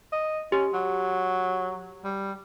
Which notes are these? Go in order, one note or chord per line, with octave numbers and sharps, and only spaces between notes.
D#5
C#4 G4
F#3
G3